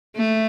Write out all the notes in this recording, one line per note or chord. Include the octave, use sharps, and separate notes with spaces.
A3